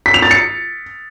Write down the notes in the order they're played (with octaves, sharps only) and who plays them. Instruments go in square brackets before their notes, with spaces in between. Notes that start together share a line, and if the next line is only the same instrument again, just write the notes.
[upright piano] B6
F7
A6
C#7